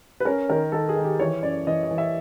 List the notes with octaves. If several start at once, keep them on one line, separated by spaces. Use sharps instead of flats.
B4
C#4 A#4
D#3 A#4
D#3 A4
G#4
D#3
G4
E3 C#5
F#2 D5
E3 D#5
D#5
E3
E5